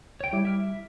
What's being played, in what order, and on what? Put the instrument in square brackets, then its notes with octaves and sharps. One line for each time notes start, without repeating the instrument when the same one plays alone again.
[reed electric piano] D2 [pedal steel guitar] C#5 G5
[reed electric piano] G3 E4 D6
[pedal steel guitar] E5 F6